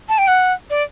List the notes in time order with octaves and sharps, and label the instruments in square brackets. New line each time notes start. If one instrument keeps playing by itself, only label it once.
[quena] A5
G5
F#5
D5